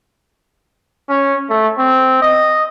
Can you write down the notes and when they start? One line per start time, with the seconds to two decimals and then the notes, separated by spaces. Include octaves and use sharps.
1.09 C#4
1.50 A3
1.78 C4
2.22 D#5